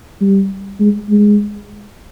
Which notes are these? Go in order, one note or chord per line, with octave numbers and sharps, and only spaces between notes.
G3
G#3
G#3